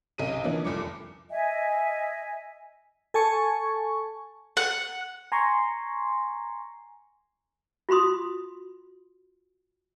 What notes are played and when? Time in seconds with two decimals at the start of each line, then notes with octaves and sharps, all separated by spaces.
0.18 B1 C3 C#4 D#5 D#7
0.44 D3 E3 F3 A#3 B3 C#4
0.65 F1 C2 F3 D6 C#7
1.30 D#5 E5 G#5
3.14 A4 G#5 A5 C#6
4.57 F#5
5.32 G#5 A#5 C6 C#6
7.89 F4 F#4 B5 C6 D#6